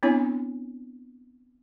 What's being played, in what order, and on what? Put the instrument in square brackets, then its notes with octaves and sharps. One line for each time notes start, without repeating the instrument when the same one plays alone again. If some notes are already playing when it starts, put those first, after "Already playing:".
[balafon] B3 C4 D4 E4 C#5 G#5